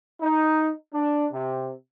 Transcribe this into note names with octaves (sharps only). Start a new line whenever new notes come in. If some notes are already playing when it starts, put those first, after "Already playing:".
D#4
D4
C3